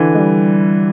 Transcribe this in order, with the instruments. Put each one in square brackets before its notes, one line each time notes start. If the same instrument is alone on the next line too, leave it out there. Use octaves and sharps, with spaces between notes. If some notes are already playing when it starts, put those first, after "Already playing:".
Already playing: [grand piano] D3 E3
[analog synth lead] G#3
G3